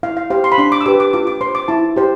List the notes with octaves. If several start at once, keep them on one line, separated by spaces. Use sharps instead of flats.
E4 F5
F5
G4 C5 F5
C6
B5
D4 C6
D6
E6
G4 B4 D6
D6
F4 D6
D6
C5 C6
D6
E4 A5
G4 C5